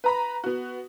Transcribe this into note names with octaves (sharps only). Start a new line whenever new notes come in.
B4 A#5 B5
B3 F#4